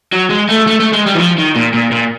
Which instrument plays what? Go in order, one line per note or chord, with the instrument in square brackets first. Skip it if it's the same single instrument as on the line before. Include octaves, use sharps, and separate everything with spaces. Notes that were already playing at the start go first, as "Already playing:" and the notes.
[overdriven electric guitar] F#3
G#3
A3
A3
A3
G#3
G3
E3
F3
D#3
A#2
A#2
A#2